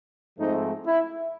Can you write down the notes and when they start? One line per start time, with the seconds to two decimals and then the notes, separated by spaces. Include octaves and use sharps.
0.39 G#2 F3 A3 C4 D#4
0.85 E4